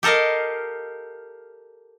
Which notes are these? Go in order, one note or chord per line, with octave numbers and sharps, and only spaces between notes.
G4 A4 A#4 D#5 F5